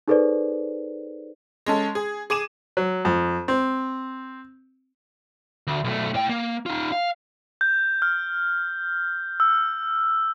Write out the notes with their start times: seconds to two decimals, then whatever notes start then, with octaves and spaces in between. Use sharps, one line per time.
0.08 D#4 G#4 A4 B4 C5 D5
1.66 G#3 C#4 A4
1.95 G#4
2.30 G#4 D6 D#7 E7
2.77 F#3
3.05 F2
3.48 C4
5.67 D2
5.84 B1 A3
6.14 A2 G5
6.29 A#3
6.66 D#4 F4
6.92 F5
7.61 G6
8.02 F6
9.40 E6